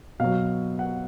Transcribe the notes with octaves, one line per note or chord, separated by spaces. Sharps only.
B2 F#3 F5
F#5